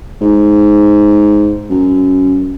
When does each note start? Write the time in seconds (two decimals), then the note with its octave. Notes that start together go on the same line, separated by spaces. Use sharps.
0.21 G#2
1.70 F#2